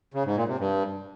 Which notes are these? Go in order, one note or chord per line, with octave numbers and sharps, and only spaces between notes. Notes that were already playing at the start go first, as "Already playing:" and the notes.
C#3
G#2
A#2
C3
G2